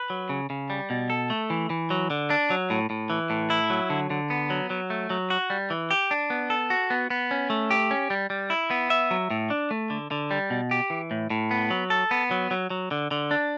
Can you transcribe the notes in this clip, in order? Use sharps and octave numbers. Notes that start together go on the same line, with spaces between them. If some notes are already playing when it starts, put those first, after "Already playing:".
Already playing: B4
F#3
C#3
C#3
G3
B2
A4
A3
E3
E3
F#3
D3
D4
F#3
A2
A2
E3
A2
E4
F#3
D3
D3
B3
F#3
F#3
A3
F#3
F#4
G3
E3
G4
D4
B3
A4
F#4
B3
B3
C#4
A3
G4
C#4
G3
G3
E4
B3
E5
F#3
A2
D4
A3
D3
D3
G3
B2
G4
E3
A2
A2
B3
F#3
A4
B3
F#3
F#3
F#3
D3
D3
D4